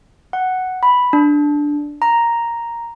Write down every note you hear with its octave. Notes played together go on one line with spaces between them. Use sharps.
F#5
B5
D4
A#5